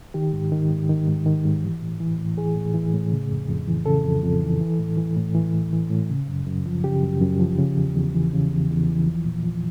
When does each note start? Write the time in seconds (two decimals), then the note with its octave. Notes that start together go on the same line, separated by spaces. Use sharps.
0.14 D#3 G4
0.33 G#2
0.52 D#3
0.70 G#2
0.89 D#3
1.07 G#2
1.26 D#3
1.45 G#2
1.63 E3
1.82 A2
2.00 E3
2.18 A2
2.37 E3 G#4
2.56 A2
2.74 E3
2.93 A2
3.12 C#3
3.30 F2
3.48 F2
3.67 E3
3.86 C#3 A4
4.04 F2
4.23 F2
4.42 E3
4.60 E3
4.79 A2
4.97 E3
5.16 A2
5.34 E3
5.53 A2
5.72 E3
5.90 A2
6.09 C#3
6.28 F#2
6.46 F#2
6.66 F3
6.84 C#3 G4
7.03 F#2
7.21 F#2
7.40 F3
7.58 C#3
7.77 E2
7.95 E2
8.14 E3
8.33 C#3
8.51 E2
8.70 E2
8.89 E3
9.07 F3
9.25 A#2
9.44 F3